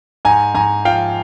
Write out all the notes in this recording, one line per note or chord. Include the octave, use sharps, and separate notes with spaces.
G#2 G#5 A#5
G#2 G#5 A#5
F3 F5 G5